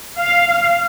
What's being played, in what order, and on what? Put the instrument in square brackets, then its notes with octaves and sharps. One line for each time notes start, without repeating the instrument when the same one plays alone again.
[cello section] F5